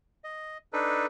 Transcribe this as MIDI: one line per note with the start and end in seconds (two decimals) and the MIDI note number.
0.24 0.58 75
0.73 1.06 62
0.73 1.06 63
0.73 1.06 69
0.73 1.06 71